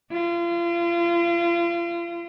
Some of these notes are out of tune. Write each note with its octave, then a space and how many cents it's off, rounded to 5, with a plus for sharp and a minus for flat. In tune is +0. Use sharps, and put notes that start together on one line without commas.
F4 -35